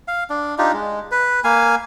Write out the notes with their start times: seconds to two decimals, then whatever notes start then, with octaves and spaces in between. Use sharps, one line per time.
0.08 F5
0.30 D4
0.58 D4 D#4 F4 G4
0.73 G#3
1.11 B4
1.44 A#3 F5 G#5